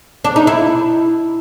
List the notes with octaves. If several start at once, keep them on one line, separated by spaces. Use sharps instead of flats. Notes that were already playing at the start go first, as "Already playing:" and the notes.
D4
D#4
E4